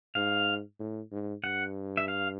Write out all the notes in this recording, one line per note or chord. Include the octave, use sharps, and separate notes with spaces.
G#2 F5
A2
G#2
G2 F#5
E5
F5